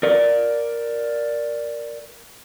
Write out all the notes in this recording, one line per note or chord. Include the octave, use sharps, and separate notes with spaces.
A#4 D5